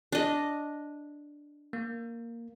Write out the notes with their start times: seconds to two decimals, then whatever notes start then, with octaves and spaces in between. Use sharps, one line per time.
0.12 D4 D#5
1.73 A#3